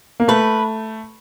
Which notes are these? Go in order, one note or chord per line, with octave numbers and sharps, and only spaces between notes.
A#3
A3 B4